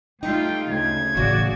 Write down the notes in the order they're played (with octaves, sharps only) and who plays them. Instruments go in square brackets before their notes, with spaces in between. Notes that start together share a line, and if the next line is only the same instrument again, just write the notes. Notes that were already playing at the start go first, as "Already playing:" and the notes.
[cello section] G3 A3 F4 [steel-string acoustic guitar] D#4 [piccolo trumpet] G5
[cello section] D2 C#3 [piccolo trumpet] G#6
[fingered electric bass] A1 [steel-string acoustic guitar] C#3 [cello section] F#4 D5